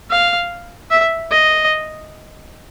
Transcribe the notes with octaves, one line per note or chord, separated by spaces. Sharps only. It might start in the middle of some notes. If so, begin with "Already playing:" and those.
F5
E5
D#5